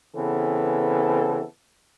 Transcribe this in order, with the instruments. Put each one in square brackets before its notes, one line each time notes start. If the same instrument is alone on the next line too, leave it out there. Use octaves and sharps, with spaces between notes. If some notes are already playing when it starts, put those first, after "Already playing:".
[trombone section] C#3 E3 B3 C4 A4